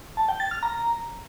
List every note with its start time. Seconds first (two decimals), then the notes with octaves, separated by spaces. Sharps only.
0.17 A5
0.28 G5
0.40 A6
0.51 F6
0.63 A#5